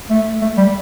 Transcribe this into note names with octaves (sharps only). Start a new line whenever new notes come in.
A3
A3
G3